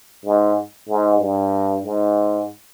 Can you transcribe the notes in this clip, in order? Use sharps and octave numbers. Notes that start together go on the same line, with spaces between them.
G#2
G#2
G2
G#2